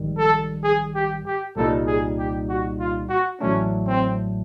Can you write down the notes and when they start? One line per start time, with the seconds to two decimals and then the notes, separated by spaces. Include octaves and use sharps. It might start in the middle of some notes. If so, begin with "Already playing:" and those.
Already playing: A#1 G#2 D#3 G3
0.18 A4
0.64 G#4
0.95 G4
1.26 G4
1.56 C2 A#2 G3 A#3 D#4 A4
1.87 G#4
2.18 G4
2.49 F#4
2.79 F4
3.10 F#4
3.41 A1 A2 F#3 A3 C#4 D4
3.87 C4